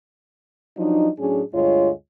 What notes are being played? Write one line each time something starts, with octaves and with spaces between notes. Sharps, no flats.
F3 F#3 D4 D#4
A2 F#3 C#4 D4 G#4
D2 G2 G#3 F4 C#5